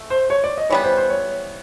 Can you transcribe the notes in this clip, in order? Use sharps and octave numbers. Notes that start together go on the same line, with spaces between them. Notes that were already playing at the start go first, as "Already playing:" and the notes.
Already playing: A3
C5
C#5
D5
D#5
E3 G3 B3 C#5
C5
C5
C#5